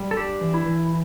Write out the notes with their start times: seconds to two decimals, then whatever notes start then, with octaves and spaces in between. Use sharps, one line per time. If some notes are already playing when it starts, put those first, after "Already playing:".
Already playing: G3
0.11 A4
0.17 D4 G4
0.41 E3
0.54 E4
0.66 E3